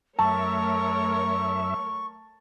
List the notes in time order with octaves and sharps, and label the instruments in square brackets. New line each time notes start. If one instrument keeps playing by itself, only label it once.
[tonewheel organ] F#2 E5 [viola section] A3 A#4 C#5 [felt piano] A5 [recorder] C#6